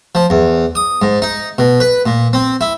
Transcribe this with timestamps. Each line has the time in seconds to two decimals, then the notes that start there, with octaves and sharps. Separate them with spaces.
0.15 F3
0.30 E2
0.75 D#6
1.02 G#2
1.22 D#4
1.58 B2
1.80 B4
2.06 A#2
2.33 C4
2.61 E4